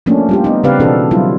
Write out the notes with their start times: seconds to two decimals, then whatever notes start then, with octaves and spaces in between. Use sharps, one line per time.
0.06 F3 A3 A#3 C#4 D4
0.29 G3 F4 G4
0.44 B3 D#4
0.63 C#3 C4 G4 B4 D5 F5
0.80 B2 E3 C4 D4 F#4 A4
1.11 F#3 G3 E4 F4